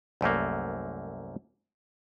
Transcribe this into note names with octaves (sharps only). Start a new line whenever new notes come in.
C2 F#2 A3 A#3